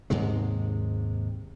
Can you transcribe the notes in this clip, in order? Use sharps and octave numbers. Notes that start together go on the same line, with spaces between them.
D#2 G#2 C3 G#3